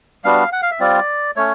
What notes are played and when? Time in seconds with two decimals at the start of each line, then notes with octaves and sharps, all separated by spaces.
0.24 G3 B3 D4 F#4 F5
0.53 F#5
0.62 F5
0.71 E5
0.80 G3 C4 F4 D5
1.36 A3 C#4 C#5